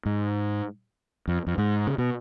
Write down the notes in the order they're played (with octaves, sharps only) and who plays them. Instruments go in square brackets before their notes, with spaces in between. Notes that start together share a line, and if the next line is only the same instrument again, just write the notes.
[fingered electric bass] G#2
F2
F2
G#2
C#3
B2